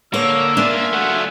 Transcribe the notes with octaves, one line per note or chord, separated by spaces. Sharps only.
D3 A#3 C#5 E6
D4 F4 E5 G#5
F#3 A3 F#5